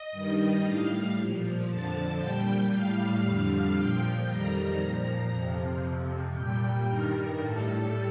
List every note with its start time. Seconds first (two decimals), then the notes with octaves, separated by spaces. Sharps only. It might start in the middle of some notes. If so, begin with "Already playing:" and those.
Already playing: D#5
0.11 G2 D#3 G3
0.63 A2 G3 F5
1.15 A#2 F3
1.67 F2 D3 F3 A5
2.19 A#2 G3 G5
2.70 A2 G3 F5
3.22 F2 D3 G3
3.74 A#2 F3 G5
4.26 F2 D#3 G3 A#5
4.78 A#2 F3
5.30 F2 C3 F3
5.82 F2 C3 F3
6.33 A#2 G3 G5
6.85 G2 D#3 G3 A#4
7.37 A2 G3 A4